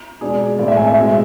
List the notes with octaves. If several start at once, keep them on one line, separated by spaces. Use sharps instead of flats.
B2 G#3 D4 G#4
A2 G#3 C4 D5
E5
G#5
E5
B2 G#3 C4